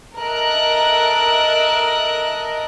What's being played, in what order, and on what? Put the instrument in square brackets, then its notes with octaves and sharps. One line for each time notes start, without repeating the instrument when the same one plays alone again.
[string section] A4 A#4 D#5 E5 F#6